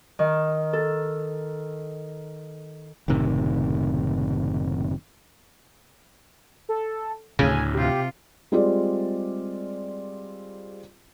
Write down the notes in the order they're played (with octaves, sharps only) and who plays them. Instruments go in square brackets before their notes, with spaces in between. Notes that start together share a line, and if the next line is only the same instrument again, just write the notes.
[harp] D#3
A4
[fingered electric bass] F#1 A2 C3 D#3
[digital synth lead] A4
[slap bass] D2 A2 [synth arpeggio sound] C#3 [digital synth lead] G#5
[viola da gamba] C3 F4 [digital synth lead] G4
[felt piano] G3 G#3 C4 F4 G#4 D5